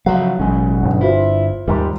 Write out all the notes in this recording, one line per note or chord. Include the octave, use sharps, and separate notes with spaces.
C#2 F3 F#3 F5 F#5
A1 B2 F#3 G#3 C#4
G1
C4 E4 F4 C5
D#2 G#2 D#3 G3